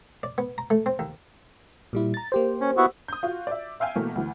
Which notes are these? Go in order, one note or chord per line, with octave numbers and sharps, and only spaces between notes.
D5
B3
A#5
A3
C4
D#2
A#2 G3 E4
A#5 A6
A#3 G4 C5
C#4
B3 E4 F#4
D#6 G6
F4 F#4
D5 E5
E5 F5 G5 G#5 F6
B2 E3 A3 A#3
D2 E3